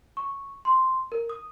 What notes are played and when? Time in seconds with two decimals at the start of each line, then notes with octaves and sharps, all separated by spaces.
0.17 C#6
0.65 C6
1.12 A#4
1.29 D#6